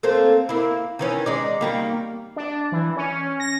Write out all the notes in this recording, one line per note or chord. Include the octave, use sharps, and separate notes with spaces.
A3 A#3 C4
A#3 E4
D#3 E3 C#4
G#3 D#4 D5
D#3 G3 A#3
D4
E3
C#4
A#6